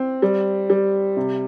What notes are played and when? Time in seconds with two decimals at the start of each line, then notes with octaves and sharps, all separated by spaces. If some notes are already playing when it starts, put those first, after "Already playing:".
Already playing: C4
0.22 G3
0.70 G3
1.16 C3